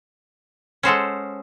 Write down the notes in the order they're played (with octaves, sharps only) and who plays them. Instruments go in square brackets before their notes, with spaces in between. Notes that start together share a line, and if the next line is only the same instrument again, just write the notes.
[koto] G#3 C#4 F#4 A4 C5